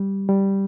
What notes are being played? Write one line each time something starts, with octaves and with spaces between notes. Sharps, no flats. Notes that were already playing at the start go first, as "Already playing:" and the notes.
Already playing: G3
G3